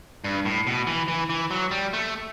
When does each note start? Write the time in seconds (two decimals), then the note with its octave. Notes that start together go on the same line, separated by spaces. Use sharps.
0.24 G2
0.45 A2
0.67 B2
0.87 E3
1.08 E3
1.30 E3
1.51 F#3
1.71 G3
1.93 A3